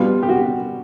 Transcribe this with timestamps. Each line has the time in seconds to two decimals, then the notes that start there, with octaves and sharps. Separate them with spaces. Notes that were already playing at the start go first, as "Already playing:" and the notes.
Already playing: B2 G3 B3 F4
0.23 G4
0.29 F#4